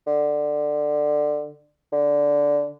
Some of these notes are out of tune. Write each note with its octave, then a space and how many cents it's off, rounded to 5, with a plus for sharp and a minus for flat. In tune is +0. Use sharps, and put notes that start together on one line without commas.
D3 +15
D3 -10